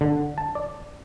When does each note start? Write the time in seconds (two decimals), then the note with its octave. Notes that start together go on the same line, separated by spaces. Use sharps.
0.01 D3
0.38 A5
0.55 D5